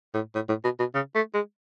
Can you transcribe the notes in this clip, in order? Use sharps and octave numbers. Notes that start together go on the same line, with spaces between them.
A2
A2
A2
B2
B2
C#3
A3
G#3